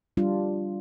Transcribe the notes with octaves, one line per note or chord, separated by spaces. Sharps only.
G3 D4 F4